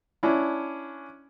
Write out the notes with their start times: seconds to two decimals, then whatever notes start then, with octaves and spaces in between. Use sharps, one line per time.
0.23 C#4 D4 E4